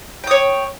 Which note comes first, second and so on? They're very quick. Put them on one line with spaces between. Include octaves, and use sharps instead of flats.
G5 D#6 C#5